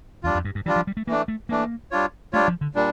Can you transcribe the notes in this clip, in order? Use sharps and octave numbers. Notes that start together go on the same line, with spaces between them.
E2 G3 D4 F4
F2
G2
G2
E3 G3 D4 F4
F3
G3
A3
E3 A3 A#3 D4
A3
E3 A3 A#3 D4
G3 D4 F4 C#5
G3 A3 D4 F4 C#5
F3
D3
A#2 G3 D4